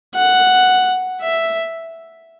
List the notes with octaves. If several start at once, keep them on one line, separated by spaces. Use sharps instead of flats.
F#5
E5